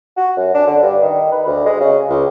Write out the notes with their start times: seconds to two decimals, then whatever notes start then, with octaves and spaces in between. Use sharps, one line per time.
0.17 F#4
0.37 F#2
0.54 D4
0.67 D3
0.82 G2
1.02 D#3
1.32 B4
1.46 D2
1.66 G#3
1.81 C#3
2.09 C#2